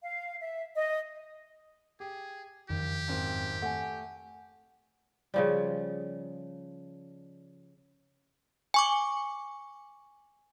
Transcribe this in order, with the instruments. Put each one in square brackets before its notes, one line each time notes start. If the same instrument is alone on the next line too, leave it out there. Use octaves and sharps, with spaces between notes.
[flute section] F5
E5
D#5
[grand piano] G4 [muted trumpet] G#4
[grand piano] F#1 [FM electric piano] F2 D#3 [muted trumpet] G4
[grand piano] G#1 F#2 C4
[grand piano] A3 [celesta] F#5 G#5
[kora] C#3 F3 G3
[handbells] G#5 C#6 D6